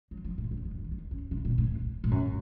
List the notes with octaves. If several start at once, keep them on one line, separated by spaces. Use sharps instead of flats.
F#3
F3
A2
C#3
D#3
C#3
D#3
C#3
C3
A#2
A2
A2
F#2